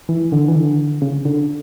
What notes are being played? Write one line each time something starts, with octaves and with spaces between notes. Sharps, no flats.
E3
D3
E3
D3
C#3
D3